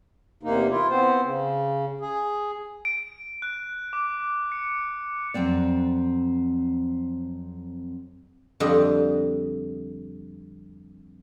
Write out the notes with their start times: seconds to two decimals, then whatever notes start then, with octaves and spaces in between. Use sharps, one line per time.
0.43 E2 C3 A#3 D#4
0.70 E4 F4
0.90 B3 C4 C5
1.23 C#3
2.01 G#4
2.85 D7
3.42 F#6
3.93 D6
4.52 C#7
5.34 F2 F#3 C4 D5
8.60 F2 D3 G3 D4 D#5